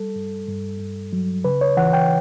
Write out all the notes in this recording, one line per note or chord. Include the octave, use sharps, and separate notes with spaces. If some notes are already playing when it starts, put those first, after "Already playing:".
Already playing: G3 A4
G2
G2
G2
F#3
C#3 B4
C#5
E3 F#5
G5